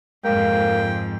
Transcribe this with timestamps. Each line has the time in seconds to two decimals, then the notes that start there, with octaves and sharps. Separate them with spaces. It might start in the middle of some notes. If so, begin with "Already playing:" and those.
0.25 F2 G#2 A#3 G5